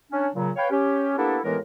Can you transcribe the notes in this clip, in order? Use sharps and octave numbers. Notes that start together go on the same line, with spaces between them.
C#4 D4
A#2 C#3 F#3
B4 C#5 F5 G5
C#4 G4
A#3 B3 D4 E4 G4 A4
D#2 A2 E3 G#3 B3 A#4